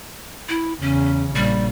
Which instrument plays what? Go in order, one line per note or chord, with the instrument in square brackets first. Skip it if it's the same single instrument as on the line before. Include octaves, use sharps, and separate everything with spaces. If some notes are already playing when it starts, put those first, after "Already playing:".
[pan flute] E4
[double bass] E2 C#3 [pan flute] C#4
[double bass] A#1 [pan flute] G3